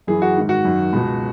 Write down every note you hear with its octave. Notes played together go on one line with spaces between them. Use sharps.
F#2 E3 G#4
F#4
G#2 D#3
F#4
F#2 D#3
C#2 B2